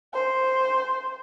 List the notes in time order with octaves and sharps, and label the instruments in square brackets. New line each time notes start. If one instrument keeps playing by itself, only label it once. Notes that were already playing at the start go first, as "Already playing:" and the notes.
[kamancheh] C5